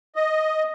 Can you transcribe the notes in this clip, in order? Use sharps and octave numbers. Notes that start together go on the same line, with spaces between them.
D#5